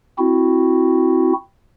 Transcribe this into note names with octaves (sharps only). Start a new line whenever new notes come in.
C4 E4 F#4